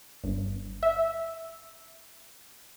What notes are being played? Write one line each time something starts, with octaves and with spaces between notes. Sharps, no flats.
G1
E5